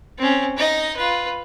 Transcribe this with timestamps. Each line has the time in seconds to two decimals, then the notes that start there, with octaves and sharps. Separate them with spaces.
0.18 C4 C#4
0.57 D#4 D#5
0.96 F4 B4